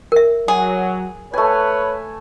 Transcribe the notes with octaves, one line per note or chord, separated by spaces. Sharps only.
A#4 E5
F#3 G#4
A3 B4 C#5 G#5